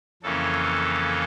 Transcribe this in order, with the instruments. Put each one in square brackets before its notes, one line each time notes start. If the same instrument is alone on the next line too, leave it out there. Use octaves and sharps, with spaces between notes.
[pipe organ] F2 C#3 E3 A#3 C#4 A4